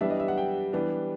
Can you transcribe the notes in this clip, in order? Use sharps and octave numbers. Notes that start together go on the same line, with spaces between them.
E3 G3 B3 D4 E5
D#5
E5
F#5
G5
E3 G3 B3 D4